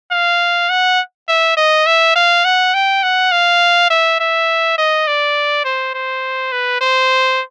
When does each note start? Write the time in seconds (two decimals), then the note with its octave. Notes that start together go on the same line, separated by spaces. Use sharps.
0.11 F5
0.70 F#5
1.28 E5
1.57 D#5
1.86 E5
2.16 F5
2.44 F#5
2.74 G5
3.03 F#5
3.31 F5
3.90 E5
4.20 E5
4.78 D#5
5.07 D5
5.65 C5
5.94 C5
6.52 B4
6.81 C5